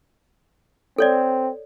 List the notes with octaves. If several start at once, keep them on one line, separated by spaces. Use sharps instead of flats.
C4 A4 C#5 D5